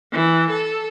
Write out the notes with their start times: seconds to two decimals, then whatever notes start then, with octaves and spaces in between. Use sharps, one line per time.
0.12 E3
0.50 A4